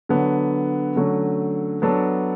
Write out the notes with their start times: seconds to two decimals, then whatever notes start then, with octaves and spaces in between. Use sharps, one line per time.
0.09 D3 F#3 B3
0.96 D3 F#3 A3 C#4
1.82 F#3 B3 D4 A4